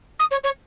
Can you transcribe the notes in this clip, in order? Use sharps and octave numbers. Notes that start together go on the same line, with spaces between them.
D#6
C#5
C#5